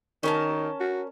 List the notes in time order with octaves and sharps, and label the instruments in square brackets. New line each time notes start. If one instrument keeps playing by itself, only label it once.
[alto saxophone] D#3 [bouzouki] C#4 A#4 A5
[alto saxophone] F#4